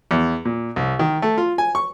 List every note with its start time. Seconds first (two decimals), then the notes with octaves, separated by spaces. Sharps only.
0.11 E2
0.45 A#2
0.76 C2
0.99 D#3
1.22 A3
1.38 F4
1.58 G#5
1.75 C#6